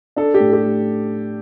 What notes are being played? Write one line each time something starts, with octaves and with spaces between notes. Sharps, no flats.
D4 A4
G4
A2
G4
A3